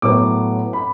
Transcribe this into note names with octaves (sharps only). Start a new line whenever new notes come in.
A2 F#3 B3 D6
B5